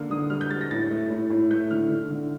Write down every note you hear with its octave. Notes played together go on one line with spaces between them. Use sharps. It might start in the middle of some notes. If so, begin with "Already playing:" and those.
Already playing: D3 A#3 F6
D3 D#6
G3 F6
G6
G3 A6
A#6
A2 A6
A3
A2
A2
A3 G6
D3 F6
D3
D3